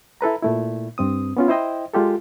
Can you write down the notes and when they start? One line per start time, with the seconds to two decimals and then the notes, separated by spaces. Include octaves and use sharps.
0.21 E4 A4 B4 A#5
0.43 A#2 A3 E4
0.98 G2 C4 D#6
1.37 B3 C#4 F4
1.48 E4 C5 D#5 G5
1.94 G#3 F4 G4 A4